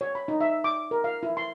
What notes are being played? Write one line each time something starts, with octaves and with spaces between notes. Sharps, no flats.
C#5
B5
D#4
E5
D6
A#4
F5
E4
C6